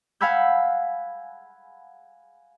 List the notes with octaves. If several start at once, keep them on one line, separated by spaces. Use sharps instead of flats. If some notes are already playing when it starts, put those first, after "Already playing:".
F5 F#5 G#5 B5 E6 G6